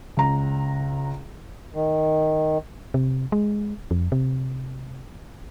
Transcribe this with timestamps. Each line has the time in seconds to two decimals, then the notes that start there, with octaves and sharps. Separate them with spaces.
0.17 C#2 A#5
1.74 D#3
2.94 C3
3.32 G#3
3.91 F2
4.12 C3